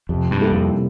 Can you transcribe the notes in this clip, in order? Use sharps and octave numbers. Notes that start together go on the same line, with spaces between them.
F2 C3
G2
G3 A#3 E4 A4
F2
C3